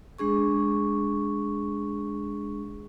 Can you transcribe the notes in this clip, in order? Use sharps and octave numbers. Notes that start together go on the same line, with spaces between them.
G#3 D4 G#4 C#6